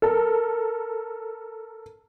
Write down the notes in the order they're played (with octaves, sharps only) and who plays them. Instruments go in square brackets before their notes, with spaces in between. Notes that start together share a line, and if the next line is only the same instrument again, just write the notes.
[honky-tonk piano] A4 A#4